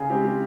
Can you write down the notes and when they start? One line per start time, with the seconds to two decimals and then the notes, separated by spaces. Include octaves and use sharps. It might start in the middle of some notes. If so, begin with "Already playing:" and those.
Already playing: C#3 G#4
0.09 G#3 C4 G4
0.24 G4